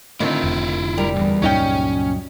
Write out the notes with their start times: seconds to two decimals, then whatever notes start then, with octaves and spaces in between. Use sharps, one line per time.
0.20 A2 D3 D#3 C4 E4 F4
0.44 F1
0.98 G3 A#4
1.16 B1 E2
1.42 C#2 G2 A#2 F#3 C#4 D#4 G5